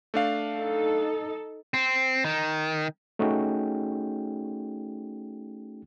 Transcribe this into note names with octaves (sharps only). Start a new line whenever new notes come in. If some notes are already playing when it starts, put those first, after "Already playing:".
A3 D4 F5
D#4 A4
C4
D#3
A3 C#4 D#4 F#4 G#4 G5